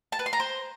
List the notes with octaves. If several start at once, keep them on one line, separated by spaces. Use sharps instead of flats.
A5
B4
C6
A#5
C5